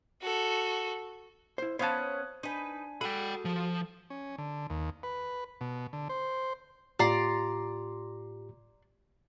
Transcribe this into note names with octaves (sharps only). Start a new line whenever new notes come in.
F#4 A4
E4 C5
B3 C#4 C5 C#5 F5 A5 D#6 F#6
D4 D#4 B4 G#5
F#4 G#4 A4 F#5 G5 B5
F3
C#4
D3
D#2
B4
B2
D3
C5
A2 F4 G4 D5 A#5 C6